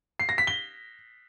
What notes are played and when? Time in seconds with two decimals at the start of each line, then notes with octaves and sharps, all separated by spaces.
0.20 C7
0.29 A#6
0.38 B6
0.47 G7